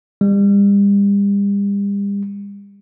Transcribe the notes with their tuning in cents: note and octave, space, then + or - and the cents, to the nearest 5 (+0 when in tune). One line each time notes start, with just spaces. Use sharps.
G3 +40